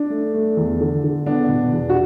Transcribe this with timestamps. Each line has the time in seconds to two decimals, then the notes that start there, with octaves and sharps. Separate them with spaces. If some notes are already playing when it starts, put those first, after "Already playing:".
Already playing: D4
0.10 A3
0.34 A3
0.57 E2
0.81 D3
1.04 D3
1.26 B3 D4
1.49 B2
1.72 E2
1.89 F#4